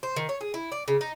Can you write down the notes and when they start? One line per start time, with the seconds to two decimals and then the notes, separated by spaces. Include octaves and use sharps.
0.03 C5
0.16 D#3
0.29 C#5
0.41 G#4
0.54 E4
0.72 D5
0.88 C#3
1.01 D#4